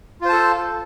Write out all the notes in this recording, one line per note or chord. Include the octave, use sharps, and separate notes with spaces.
F4 A4 C5 A5